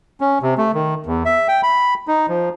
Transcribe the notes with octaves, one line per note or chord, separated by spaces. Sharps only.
C#4
C3
A3
D#3
E2
E5
G5
B5
D#4
F3